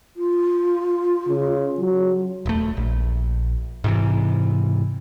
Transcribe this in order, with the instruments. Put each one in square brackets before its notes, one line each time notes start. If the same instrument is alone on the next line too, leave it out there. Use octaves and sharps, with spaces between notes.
[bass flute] F4
[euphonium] C#3
F#3
[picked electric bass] D#1 A3
A#1
G#2 C3 E3